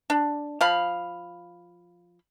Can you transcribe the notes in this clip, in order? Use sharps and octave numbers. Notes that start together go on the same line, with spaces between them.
D4
F3 F5 B5